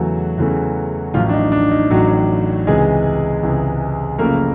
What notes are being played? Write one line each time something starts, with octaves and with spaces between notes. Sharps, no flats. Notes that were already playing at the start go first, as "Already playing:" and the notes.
Already playing: E2 C#3 E3 F#3 A3 F#4
E2 C#3 E3 A3
A1 A2 F3 F#3 F4
D4
D#4
D4
D#4
A1 A2 F#3 F#4
C#2 C3 E3 G#3 G#4
C#2 C3 E3
F#1 F#2 C#3 F3 A3 A#3 A#4